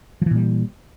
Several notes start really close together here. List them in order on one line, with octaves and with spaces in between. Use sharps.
F3 E3 A#2 G3